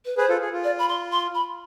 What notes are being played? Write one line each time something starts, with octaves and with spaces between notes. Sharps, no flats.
B4
G#4 B4 C5
F4 A4
G#4
F4
D5
B5
C6
C6
B5